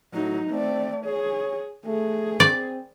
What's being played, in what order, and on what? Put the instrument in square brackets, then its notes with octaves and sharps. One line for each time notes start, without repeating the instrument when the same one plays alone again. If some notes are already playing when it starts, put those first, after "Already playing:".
[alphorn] A2 [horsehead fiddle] F#3 D#4
[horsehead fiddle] A3 D5 [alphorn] C4
[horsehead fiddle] G#4 [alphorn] C#5
[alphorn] A3 [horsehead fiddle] G#4
[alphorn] C4 [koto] D5